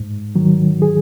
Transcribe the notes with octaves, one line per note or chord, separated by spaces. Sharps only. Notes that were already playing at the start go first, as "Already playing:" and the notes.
Already playing: G#2
D#3 F#3
G#4